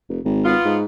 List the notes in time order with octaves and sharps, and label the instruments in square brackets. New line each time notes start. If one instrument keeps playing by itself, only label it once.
[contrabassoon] F1
G#1
[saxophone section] B3 F4
[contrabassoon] G#2